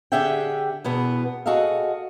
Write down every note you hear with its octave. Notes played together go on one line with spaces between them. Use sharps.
D3 G4 G#4 E5 F#5 G5
E2 B2 B3
F#4 G#4 A4 D#5 F5